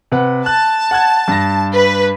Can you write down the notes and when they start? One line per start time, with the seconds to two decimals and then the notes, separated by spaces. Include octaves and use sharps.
0.12 C3 B4 F#5
0.46 A5 F#6
0.91 F#5 F#6 G#6
1.28 G2 A#6
1.73 B4